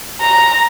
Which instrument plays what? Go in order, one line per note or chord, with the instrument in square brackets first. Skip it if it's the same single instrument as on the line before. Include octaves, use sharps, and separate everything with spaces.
[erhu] A#5